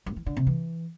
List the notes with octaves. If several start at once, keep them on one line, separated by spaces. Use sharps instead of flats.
G2
E3
D3
C3
E3